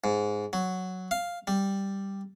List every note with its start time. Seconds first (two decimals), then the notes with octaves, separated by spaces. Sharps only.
0.04 G#2
0.53 F#3
1.11 F5
1.47 G3